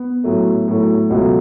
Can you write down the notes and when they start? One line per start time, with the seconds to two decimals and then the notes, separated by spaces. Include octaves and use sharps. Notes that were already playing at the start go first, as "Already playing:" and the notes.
Already playing: B3
0.24 A2 F#3 A3
0.68 A2 F#3 A3
1.10 C#2 B2 F#3 A3 F#4